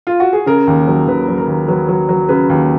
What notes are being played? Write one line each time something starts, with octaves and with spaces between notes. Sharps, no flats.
F4
F#4
G#4
C#3 A#4
D#2
F#3
D#2 B4
F#3
A#4
D#2
F#3 B4
F#3
F#3
C#3 B4
D#2